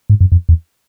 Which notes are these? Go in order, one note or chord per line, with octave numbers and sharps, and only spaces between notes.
G#2
F#2
F2
E2